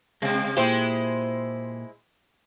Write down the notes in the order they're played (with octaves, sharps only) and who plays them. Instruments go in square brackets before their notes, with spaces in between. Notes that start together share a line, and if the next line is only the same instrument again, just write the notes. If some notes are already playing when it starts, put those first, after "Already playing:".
[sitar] C3 [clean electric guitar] G#3 C4
[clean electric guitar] A#2 G4 [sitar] G#3 E4 C5